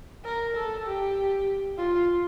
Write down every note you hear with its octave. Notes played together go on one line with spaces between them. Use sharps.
A#4
A4
G4
F4